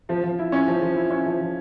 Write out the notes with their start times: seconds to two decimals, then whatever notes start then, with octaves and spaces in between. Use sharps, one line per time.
0.09 F3
0.23 F3
0.39 E4
0.52 C#4
0.67 F3
0.82 F3
0.96 E4
1.10 C#4
1.25 F3
1.40 F3